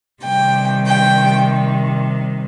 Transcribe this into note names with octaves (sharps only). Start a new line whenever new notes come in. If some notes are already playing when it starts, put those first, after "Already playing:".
C3 D#3 G3 G5
G5